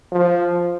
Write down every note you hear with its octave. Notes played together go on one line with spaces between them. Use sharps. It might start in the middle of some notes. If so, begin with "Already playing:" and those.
F3